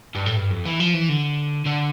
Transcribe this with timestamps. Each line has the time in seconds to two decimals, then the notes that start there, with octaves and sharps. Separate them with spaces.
0.15 G2
0.26 A2
0.36 G2
0.50 F2
0.65 E3
0.80 F3
0.94 E3
1.09 D3
1.66 D3